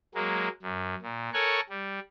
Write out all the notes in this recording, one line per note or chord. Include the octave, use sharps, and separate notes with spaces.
F#3 G#3 A#3
F#2
A#2
A4 A#4 C#5 F#5 G#5 C#6
G3